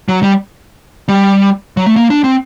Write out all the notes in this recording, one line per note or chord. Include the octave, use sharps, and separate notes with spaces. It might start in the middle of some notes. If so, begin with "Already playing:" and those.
F#3
G3
G3
F#3
A3
A#3
D4
C4